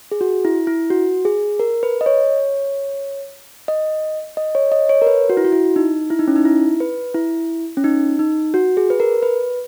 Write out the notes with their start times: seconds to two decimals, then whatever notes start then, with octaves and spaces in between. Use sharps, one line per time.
0.12 G#4
0.21 F#4
0.45 E4
0.67 E4
0.90 F#4
1.25 G#4
1.59 A#4
1.83 B4
2.01 D#5
2.06 C#5
3.68 D#5
4.37 D#5
4.55 C#5
4.72 D#5
4.89 C#5
5.02 A#4
5.07 B4
5.29 F#4
5.37 E4
5.45 F#4
5.52 E4
5.76 D#4
6.10 E4
6.19 D#4
6.28 C#4
6.36 D#4
6.45 E4
6.80 B4
7.14 E4
7.77 C#4
7.84 D#4
8.19 D#4
8.54 F#4
8.77 G#4
8.90 B4
9.00 A#4
9.23 B4